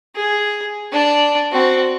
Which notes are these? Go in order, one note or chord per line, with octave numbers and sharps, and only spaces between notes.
G#4
D4 D5
C4 F#4